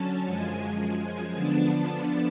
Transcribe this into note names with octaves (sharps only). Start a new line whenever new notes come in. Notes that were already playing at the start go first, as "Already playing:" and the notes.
Already playing: D3 F#3 C#4 A5
F#2 F3 G#3 G#5
D3 F3 B3 D4 A5